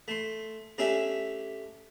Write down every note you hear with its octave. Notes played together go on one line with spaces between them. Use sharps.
A3 C6
A3 C#4 D4 G4 E5 G#5